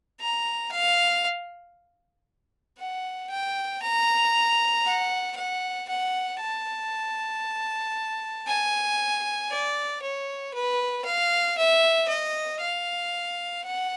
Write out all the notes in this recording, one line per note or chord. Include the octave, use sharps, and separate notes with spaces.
A#5
F5
F#5
G5
A#5
F#5
F#5
F#5
A5
G#5
D5
C#5
B4
F5
E5
D#5
F5
F#5